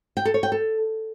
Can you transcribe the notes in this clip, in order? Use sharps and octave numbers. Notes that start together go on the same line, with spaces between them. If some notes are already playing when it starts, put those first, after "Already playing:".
G5
A4
C#5
G5
A4